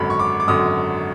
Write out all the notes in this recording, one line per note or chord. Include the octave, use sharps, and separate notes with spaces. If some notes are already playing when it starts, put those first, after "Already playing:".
Already playing: G#1 F#2 D3 B5
C#6
D6
D6
G#1 F#2 D3 D#6